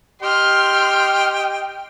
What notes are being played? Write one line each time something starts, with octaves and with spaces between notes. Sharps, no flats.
G4 D#5 G5 C6 F6